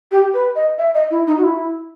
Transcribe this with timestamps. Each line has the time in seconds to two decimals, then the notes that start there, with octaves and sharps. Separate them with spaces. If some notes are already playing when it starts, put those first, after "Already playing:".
0.11 G4
0.34 B4
0.56 D#5
0.78 E5
0.94 D#5
1.11 E4
1.27 D#4
1.37 F#4
1.44 E4